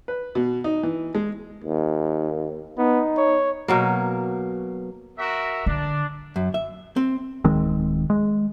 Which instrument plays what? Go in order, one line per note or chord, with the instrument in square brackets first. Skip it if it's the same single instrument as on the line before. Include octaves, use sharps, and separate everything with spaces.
[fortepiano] B4
B2
D#4
E3
G#3
[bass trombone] D#2
[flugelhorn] B3 [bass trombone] D#4
[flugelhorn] C#5
[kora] B2 F#3 A#3
[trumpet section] F#4 A#4 E5
[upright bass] D3 [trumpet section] D4
[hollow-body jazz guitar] F#2
E5
C4
[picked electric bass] D1 D#3 G#3 C4
G#3